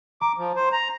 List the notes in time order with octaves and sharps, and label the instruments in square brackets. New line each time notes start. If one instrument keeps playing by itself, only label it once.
[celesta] A#5 [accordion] D6
[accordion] F3
C5
A#5